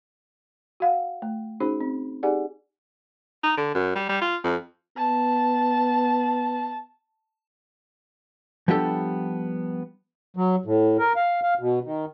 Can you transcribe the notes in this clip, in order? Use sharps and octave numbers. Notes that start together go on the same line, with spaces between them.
F#4 F5 F#5
A3
C#4 D#4 F#4 G#4 C5 B5
C4
D#4 G4 G#4 D5 F#5 G#5
D#4
D3
F#2
G3
G3
F4
F2
B3 A5
F3 G3 B3 D4 G4 A4
F#3
A2
A#4
F5
F5
B2
D#3